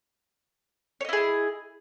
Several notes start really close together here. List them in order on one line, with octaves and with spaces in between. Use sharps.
C#5 D#5 E4 G#4